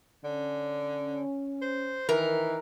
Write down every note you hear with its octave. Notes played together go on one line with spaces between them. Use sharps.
D3 C#4
C5
D#3 E3 A#4